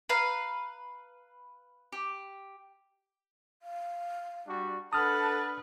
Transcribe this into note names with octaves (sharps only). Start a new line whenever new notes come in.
B4 F5 A#5 B5
G4
F5
G3 D4 F#4
D4 A4 B4 F#5 A5 D#6 F6